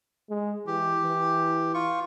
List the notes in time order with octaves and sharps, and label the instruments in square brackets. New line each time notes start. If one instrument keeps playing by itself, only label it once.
[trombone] G#3
[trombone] E3 [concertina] G4
[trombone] E3
[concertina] F4 C#6